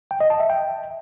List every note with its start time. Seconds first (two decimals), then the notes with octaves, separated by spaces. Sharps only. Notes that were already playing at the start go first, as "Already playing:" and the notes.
0.11 G5
0.21 D#5
0.30 A5
0.40 E5
0.50 G5